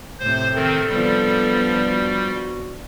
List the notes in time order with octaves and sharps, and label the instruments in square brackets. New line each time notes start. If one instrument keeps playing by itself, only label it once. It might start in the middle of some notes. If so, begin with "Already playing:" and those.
[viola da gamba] A2 C3 [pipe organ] C5
[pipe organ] D#3 C4 [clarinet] A4
[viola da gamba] F3 B3 D4 [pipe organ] G3
[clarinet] F#4